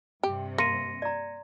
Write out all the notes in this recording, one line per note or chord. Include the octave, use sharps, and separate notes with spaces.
G2 C3 G4
A#3 C6 A#6 C#7 D#7
D5 A#5